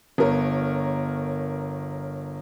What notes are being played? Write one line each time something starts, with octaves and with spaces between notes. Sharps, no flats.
G1 A#4 C#5